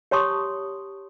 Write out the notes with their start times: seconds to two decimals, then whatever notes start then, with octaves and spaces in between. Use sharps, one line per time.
0.11 G4 C#5 A5 C6 C#6 D#6